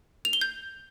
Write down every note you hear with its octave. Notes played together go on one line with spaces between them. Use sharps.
F7
G7
G6